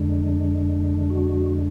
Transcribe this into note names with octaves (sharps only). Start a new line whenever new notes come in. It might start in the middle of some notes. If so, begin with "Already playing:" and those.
Already playing: F2 D3 G#3 D4
F#4